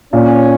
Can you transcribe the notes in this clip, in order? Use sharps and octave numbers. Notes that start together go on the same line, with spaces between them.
A#2 C#4